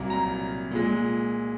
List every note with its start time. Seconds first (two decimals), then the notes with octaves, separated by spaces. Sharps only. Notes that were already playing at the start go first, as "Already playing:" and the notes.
Already playing: C2 A#2 F#3 A#3 A#5
0.10 A#5
0.71 A#2 G#3